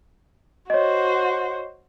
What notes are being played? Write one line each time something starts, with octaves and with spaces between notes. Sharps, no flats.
F#4 C5 C#5 D#5